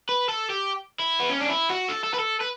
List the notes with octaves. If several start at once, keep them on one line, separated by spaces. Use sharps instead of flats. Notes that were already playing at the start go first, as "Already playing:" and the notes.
B4
A4
G4
E4
B3
C#4
D4
E4
F#4
A4
A4
B4
A4
B4